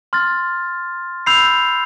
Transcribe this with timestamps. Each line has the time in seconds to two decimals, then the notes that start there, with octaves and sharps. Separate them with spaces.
0.13 C6 F6 A6
1.26 B5 E6 G6 C7 F7